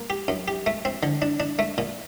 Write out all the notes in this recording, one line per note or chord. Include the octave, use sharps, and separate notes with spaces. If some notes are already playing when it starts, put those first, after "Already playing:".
Already playing: A#3
G4
F#2
G4
A3
C4
D3
D4
D4
A3
A#2